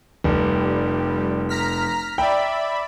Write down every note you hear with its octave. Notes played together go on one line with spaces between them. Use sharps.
F1 G3
A#5 F6 B6
D5 E5 G5 B5